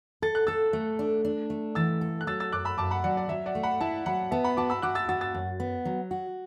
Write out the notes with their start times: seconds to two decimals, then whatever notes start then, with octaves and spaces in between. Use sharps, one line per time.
0.22 A4 A6
0.35 F#6
0.47 A4 E6 A6
0.73 A3
0.99 D4
1.25 D4
1.50 A3
1.75 E3 E6 A6
2.01 A4
2.21 F#6
2.27 F#3 E6 A6
2.40 E6 A6
2.52 F#2 D6 F#6
2.65 B5 E6
2.78 F#2 A5 D6
2.91 F#5 B5
3.04 F#3 D5 F#5
3.17 D5
3.29 F#3 E5
3.46 D5 F#5
3.55 A3
3.63 F#5 B5
3.81 E4 E5 A5
4.06 F#3 F#5 B5
4.31 B3 E5 A5
4.44 F#5 B5
4.57 F#4 A5 D6
4.70 B5 E6
4.82 F#4 D6 F#6
4.95 E6 A6
5.09 F#4 E6 A6
5.21 E6 A6
5.34 F#2
5.60 B3
5.85 F#3
6.11 F#4